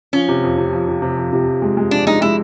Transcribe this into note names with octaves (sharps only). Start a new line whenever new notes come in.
F3 C#4
C3
F2
C3
F3
C3
C3
F3
C3
F3
G#3
G#3
F3 D4
G#3 D#4
G#3 E4